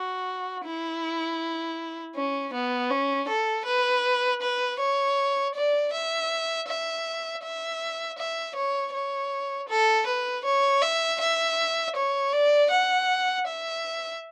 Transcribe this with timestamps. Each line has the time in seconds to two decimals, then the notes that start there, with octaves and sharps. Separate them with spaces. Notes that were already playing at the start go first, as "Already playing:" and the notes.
Already playing: F#4
0.65 E4
2.16 C#4
2.54 B3
2.90 C#4
3.28 A4
3.66 B4
4.42 B4
4.80 C#5
5.55 D5
5.93 E5
6.68 E5
7.44 E5
8.18 E5
8.56 C#5
8.93 C#5
9.69 A4
10.07 B4
10.45 C#5
10.82 E5
11.21 E5
11.96 C#5
12.33 D5
12.71 F#5
13.47 E5